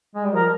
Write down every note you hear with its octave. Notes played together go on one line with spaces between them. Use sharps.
G#3
G3
F3 A#4